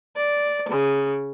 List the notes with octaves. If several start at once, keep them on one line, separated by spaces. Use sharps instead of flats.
D5
C#3